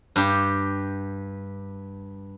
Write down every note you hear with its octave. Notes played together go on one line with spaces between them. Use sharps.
G2 G4